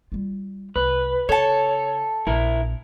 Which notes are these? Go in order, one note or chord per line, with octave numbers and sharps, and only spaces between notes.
G3 F4
C2 B4
C#3 A4 C#5 A5
A#1 E4 A#4